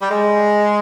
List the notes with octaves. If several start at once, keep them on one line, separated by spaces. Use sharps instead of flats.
G3
G#3